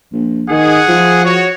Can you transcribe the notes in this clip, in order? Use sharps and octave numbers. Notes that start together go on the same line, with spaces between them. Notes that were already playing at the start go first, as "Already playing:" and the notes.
A#1
D#3 G#4 F#5
F3
F#4 C#5